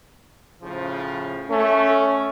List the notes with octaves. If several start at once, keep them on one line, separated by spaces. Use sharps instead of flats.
A2 C#3 F3
A3 C#4